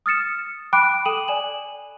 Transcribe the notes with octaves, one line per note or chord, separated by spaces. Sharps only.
D#6 F6 A6 C#7 E7
G5 B5 D6 F#6 D7
A4 G5 D#6 D#7 E7 F#7
D5 G#5 E7 F#7